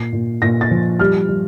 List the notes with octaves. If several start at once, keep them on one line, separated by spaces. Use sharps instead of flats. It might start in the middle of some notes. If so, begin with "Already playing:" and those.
Already playing: A#2 C7
A#2
A#2 A#6
A6
F3
G3 F6
G3